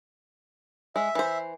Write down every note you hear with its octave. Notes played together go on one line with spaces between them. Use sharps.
G#3 E5
E3 C5